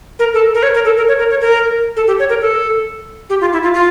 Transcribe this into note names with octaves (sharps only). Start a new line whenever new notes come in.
A#4
A4
A#4
C#5
A#4
A4
A#4
C#5
A#4
C#5
A#4
A4
G4
C#5
A#4
A4
G4
F4
E4
F4
F4